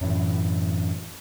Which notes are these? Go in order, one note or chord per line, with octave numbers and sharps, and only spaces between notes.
F#2 A2 E3